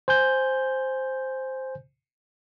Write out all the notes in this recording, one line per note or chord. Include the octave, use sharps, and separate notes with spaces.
C5 G#5 G6